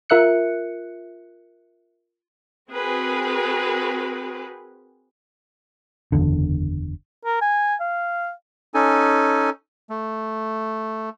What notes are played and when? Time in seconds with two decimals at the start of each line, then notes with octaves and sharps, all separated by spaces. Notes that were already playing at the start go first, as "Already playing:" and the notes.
0.10 F4 A#4 E5 F#6 C#7
2.69 C4 F#4 G#4 A#4 B4
6.12 F#1 B1 E2 D3
7.25 A#4
7.41 G#5
7.80 F5
8.74 C#4 D#4 A4 G#5
9.90 A3